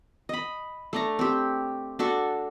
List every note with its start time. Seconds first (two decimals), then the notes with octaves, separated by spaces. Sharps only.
0.29 D#5 B5
0.93 A3 D4 A#5
1.19 C4 G4
1.99 D4 F#4 A4 C#6